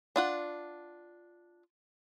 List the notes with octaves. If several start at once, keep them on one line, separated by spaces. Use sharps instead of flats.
D4 F4 F#5